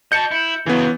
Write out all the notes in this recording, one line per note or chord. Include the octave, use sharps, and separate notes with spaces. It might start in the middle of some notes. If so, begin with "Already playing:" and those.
D#5 A5 G6 C#7
E4
C#3 E3 F#3 B3